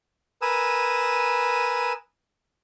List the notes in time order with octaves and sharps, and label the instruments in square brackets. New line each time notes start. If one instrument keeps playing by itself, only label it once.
[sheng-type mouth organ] A#4 B4 G#5 D#6 E6